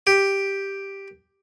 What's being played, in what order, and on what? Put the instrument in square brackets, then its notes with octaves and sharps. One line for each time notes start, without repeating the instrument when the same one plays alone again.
[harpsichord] G4